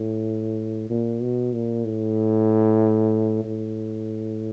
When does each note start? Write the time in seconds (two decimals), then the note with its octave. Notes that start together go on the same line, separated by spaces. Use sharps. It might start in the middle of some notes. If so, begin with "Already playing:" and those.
Already playing: A2
0.90 A#2
1.22 B2
1.54 A#2
1.85 A2
3.44 A2